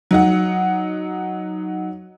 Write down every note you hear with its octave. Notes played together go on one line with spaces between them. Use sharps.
F#3 D#4 F#5